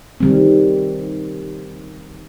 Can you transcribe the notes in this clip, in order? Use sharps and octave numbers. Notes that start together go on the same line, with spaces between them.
D#3 G3 C4